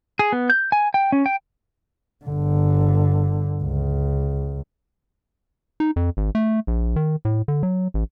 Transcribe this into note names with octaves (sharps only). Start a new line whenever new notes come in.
G#4
B3
G6
G#5
G5
C#4
G5
G1 D3
C#2
D#4
F2
G#1
A3
A#1
D#3
A2
D3
F#3
A1